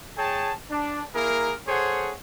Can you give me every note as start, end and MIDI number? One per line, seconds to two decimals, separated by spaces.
0.18 0.53 68
0.18 0.53 73
0.18 0.53 79
0.18 0.53 81
0.71 1.03 62
1.15 1.55 58
1.15 1.55 64
1.15 1.55 68
1.15 1.55 70
1.68 2.14 68
1.68 2.14 69
1.68 2.14 72
1.68 2.14 73
1.68 2.14 78